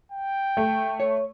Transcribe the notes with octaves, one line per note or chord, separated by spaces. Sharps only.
G5
A3
C#5